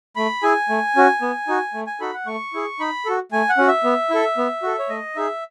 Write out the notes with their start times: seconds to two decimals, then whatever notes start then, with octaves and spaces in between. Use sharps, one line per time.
0.16 A3 B5
0.42 E4 G#4 G#5
0.69 A3
0.96 C#4 F#4
1.22 B3
1.48 D#4 F#4
1.74 A3
1.87 G#5
2.01 D#4 F#4 A4 B5
2.13 F#5
2.26 A3 C#6
2.54 E4 G#4
2.80 D#4 B5
3.06 F#4 A4
3.32 A3 G#5
3.49 F#5
3.58 C#4 F#4
3.67 E5
3.84 B3
4.10 E4 A4
4.38 B3
4.63 F#4 A4
4.79 C#5
4.89 A3 D#5
5.16 D#4 G#4 E5